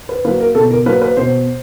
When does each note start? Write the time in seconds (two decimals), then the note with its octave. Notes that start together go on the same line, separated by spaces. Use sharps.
0.09 B4
0.25 A#3 B4
0.28 F#3
0.40 A#4
0.55 B2 A4
0.71 A#4
0.86 F#3 A#3 B4
1.02 B4
1.17 B2 C5